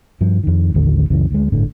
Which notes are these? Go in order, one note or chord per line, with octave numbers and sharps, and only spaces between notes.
G2 F3
F2 D#3
A1 D#2 D3 A3
C#2 F#2 C#3 E3
D2 G#3
G1 A2 D3